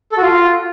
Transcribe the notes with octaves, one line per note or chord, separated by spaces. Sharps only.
A4
F#4
F4